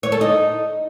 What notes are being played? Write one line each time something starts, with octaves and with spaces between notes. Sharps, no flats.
C#5
A4
D#4